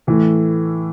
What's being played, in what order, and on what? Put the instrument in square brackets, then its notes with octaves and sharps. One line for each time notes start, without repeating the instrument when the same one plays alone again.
[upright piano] A2 E3 A3